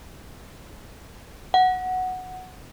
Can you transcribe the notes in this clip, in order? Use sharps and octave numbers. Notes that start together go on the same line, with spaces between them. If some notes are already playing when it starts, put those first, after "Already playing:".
F#5